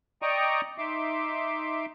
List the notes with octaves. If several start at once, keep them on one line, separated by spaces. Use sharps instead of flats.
D5 D#5 G5 A#5 C#6 D#6
D#4 E5 C6 D6